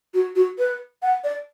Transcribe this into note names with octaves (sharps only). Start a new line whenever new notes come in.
F#4
F#4
B4
F#5
D5